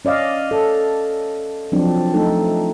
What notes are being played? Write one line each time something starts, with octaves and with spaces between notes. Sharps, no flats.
C#4 D5 D#5 F5
A4
F3 F#3 C4 D4
A3 D#4 A4